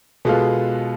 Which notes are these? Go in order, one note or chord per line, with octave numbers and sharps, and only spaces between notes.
B2 G#3 B3 F4 A4